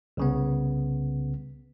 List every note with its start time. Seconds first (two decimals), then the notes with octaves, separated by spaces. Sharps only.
0.17 C2 C#3 B3